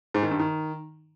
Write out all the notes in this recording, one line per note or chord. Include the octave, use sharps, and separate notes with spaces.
G#2
D#3
G2
D#3